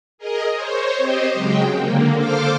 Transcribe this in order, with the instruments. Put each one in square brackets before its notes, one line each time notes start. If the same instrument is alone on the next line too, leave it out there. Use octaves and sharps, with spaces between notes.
[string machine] G#4 A#4 D#5
C5 C#5
C4 G4 C5 D#5
C#3 F#3 G#3 G5
D3 A#3
A4 C5 F5 D6 F6